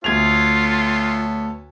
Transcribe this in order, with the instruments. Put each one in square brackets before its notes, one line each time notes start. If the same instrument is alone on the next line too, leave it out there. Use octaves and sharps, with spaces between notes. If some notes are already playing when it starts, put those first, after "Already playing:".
[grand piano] D2 G#6 F7 [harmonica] B3 A4 C#5 [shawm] F4